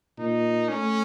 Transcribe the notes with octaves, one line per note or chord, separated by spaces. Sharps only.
A#2 D#4
A3 C#4